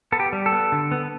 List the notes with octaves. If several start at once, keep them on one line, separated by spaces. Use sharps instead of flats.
B3 A4
G4
G3
A4
B3
D3
B3